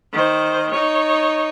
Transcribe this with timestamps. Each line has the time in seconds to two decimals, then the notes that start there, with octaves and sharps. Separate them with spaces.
0.12 D#3 C5
0.71 D#4 C#5